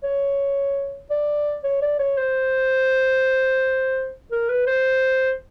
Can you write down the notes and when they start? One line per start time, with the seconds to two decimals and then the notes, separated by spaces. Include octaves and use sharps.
0.03 C#5
1.10 D5
1.64 C#5
1.82 D5
1.99 C#5
2.17 C5
4.31 A#4
4.49 B4
4.67 C5